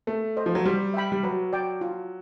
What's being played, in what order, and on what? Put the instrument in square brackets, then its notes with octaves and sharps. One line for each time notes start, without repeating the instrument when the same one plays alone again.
[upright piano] A3 [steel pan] A4
[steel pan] C5 D#5
[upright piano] F3
F#3
[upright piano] G3 [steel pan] C5
[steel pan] E5 G5 B5
[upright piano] G3
[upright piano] F#3 [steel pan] B4
[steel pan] D5 G5
F4